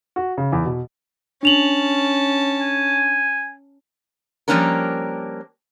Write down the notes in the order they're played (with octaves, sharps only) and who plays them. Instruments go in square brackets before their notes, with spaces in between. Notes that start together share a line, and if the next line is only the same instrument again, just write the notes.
[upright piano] F#4
C#3
E2
B2
[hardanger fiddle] C#4 A5 [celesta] D4 F7 F#7
[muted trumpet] G#5
[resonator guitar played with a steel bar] F3 G3 A#3 C#4 D4 A#4